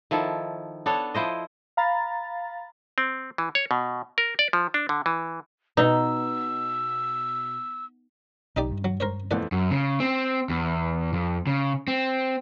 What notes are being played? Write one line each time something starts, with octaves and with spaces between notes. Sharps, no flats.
D#3 F3 E4 A4
B3 D4 A4 C#5
F3 E4 C5 D#5
F5 A#5 B5 A6
C4
E3
C#5
B2
A#4
D5
F3
D4
D3
E3
B2 D#4 B4 D#5 E6
B1 D#4 G4 D5
G2
F#3
A#4 C5 C#5
F2 E3 A3 D5 F#5
F#2
C#3
C4
E2
F2
C#3
C4